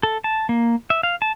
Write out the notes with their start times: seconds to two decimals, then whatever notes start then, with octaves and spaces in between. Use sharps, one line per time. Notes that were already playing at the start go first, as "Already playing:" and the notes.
0.03 A4
0.24 A5
0.49 A#3
0.90 E5
1.03 F5
1.22 A5